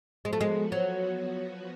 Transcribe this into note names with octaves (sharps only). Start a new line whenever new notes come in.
F3 G#3 B3 F#4
A3
G#3
F#3